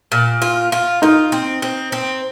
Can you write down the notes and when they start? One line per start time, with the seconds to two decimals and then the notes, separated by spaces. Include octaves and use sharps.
0.12 A#2
0.42 F4
0.72 F4
1.02 D#4 F4
1.32 C4
1.62 C4
1.92 C4